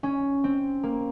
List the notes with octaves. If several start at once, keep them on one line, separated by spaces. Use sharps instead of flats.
C#4
C4
A#3